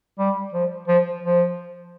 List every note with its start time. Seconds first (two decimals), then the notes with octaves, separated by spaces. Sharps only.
0.19 G3
0.54 F3
0.88 F3
1.23 F3